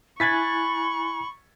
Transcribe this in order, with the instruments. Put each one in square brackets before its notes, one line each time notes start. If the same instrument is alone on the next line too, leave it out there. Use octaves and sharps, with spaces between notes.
[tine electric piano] E4 G#5 F#6 [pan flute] B5 [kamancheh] C#6 [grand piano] G#6 A6 B6